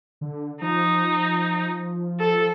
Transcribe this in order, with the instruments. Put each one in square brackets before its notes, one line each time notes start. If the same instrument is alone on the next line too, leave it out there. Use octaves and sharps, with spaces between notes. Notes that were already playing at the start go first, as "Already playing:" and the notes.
[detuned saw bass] D3
[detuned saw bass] F3 [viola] D#4
[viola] A4